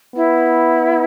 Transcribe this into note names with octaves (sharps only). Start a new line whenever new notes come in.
B3 E4